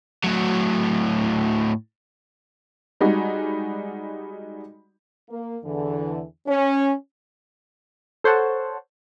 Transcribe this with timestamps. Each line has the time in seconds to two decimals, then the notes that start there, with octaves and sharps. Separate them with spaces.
0.24 A2 F#3
3.01 G3 G#3 D#4 F#4
5.29 A#3
5.64 E2 D3 E3
6.47 C#4
8.24 A4 C5 C#5 F#5 A5